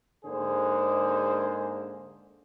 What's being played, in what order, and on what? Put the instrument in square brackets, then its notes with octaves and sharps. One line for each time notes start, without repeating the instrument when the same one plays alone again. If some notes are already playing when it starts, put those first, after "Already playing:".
[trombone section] G#2 D3 A#3 G#4 C5